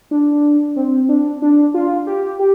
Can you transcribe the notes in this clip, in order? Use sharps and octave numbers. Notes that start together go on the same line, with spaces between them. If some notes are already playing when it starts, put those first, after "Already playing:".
D4
C4
D4
D4
F4
G4
G4